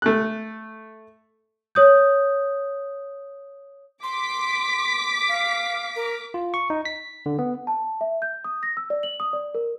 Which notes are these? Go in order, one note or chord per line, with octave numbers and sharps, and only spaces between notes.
A3 F#6
C#5 D#6 G6
C6 D6 B6
F5
A#4
F4
C#6
D#4
B6
D3
B3
A5
E5
G6
D#6
A#6
E6
D5
F#7
D#6
D5
A#4